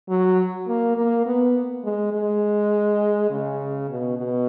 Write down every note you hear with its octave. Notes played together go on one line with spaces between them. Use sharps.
F#3
A#3
A#3
B3
G#3
G#3
C#3
B2
B2